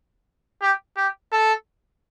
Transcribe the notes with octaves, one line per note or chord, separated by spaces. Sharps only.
G4
G4
A4